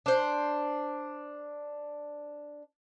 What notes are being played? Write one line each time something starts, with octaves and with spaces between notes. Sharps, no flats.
D4 C5